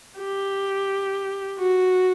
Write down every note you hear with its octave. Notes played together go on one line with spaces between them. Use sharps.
G4
F#4